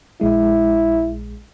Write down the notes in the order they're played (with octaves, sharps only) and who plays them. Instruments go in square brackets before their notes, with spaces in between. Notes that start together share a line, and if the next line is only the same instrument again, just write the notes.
[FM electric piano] A#1 G#3 [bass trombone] E4